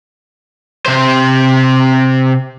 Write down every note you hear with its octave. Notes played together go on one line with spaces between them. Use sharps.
C3 C5